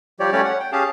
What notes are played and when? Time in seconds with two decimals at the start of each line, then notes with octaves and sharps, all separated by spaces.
0.20 F3 G3 G4 C#5 D5
0.32 G3 A3 C#4 G4 C#5 D5
0.45 F#5
0.60 G5
0.72 C#4 G4 G#4 F5 A5